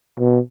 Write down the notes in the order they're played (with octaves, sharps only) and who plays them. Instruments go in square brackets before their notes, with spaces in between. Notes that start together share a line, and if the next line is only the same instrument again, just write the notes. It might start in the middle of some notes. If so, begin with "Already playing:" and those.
[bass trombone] B2